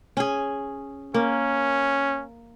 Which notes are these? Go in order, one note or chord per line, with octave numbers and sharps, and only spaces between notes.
C#4 G#4
A#3 C#4